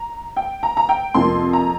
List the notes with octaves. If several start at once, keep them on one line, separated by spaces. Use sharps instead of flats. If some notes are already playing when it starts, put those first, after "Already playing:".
Already playing: A#5
G5
A#5
A#5
G5
F2 C3 F3 A#3 C6
A#5